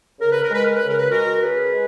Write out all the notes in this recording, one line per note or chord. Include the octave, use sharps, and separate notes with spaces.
C#3 A#4
B4
A#4
G#3 B4
A#4
B4
C#3
A#4
B4
G#3 F#4 A#4
C#3 G#4 B4
G#3